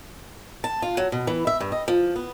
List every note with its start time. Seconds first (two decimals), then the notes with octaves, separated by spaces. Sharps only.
0.64 A5
0.82 F4
0.97 F#3
1.12 B2
1.27 E3
1.47 E5
1.60 G2
1.72 D#5
1.88 F3
2.16 B3